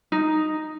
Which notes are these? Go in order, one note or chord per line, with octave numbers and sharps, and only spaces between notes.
D#4